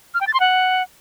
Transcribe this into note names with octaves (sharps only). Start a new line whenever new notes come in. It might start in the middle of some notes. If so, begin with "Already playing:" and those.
F6
G5
A6
C6
F#5